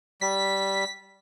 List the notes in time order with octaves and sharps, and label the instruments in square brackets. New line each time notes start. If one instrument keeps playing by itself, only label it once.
[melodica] G3 [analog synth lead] B6